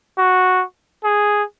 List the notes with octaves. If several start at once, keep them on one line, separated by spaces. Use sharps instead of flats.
F#4
G#4